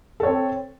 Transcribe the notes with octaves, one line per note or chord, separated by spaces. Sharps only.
C4 A4 C#5